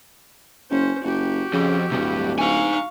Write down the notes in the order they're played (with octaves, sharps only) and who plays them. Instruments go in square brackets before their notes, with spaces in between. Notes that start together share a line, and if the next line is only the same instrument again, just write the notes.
[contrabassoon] F#1 [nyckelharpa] C#4 C5
[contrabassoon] F#1 [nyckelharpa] F#4 G4
[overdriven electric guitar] F2 [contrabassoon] C#3
[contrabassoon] D1 [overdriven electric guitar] C2 G2
[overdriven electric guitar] D#4 G#5 [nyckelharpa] F5 C#6